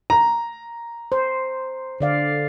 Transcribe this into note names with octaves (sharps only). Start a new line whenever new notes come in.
A#5
C5
D3 D5 F5